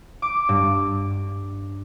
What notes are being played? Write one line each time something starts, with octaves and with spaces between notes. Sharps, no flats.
D6
G2